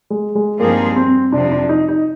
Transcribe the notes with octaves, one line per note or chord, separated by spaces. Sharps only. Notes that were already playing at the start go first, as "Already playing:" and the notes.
G#3
G#3
G2 F3 A#3 C4 D#4 G#4
C4
F2 C3 F3 D4
D4
D#4
D#4